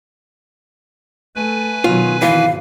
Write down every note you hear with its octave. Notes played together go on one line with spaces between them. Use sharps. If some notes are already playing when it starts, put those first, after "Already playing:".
A3 B4 G#5
B2 D#3 F#3 F4
G#1 E3 F5